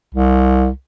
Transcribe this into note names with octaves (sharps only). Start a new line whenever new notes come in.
C2